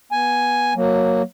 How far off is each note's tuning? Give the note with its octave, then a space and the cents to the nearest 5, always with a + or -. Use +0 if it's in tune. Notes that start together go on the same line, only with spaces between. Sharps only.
B3 -15 G#5 +0
F#3 -5 A#3 +0